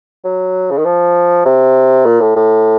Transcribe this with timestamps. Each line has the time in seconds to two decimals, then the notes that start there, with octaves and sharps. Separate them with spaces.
0.24 F#3
0.71 C#3
0.78 D#3
0.85 F3
1.45 C3
2.05 A#2
2.21 A2
2.36 A2